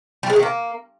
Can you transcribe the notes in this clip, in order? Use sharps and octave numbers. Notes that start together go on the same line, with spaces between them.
G3
G#3
D#3
A#3